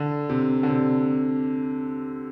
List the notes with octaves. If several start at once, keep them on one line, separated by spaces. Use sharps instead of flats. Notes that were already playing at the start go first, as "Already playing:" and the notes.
Already playing: D3
C3
D3
C3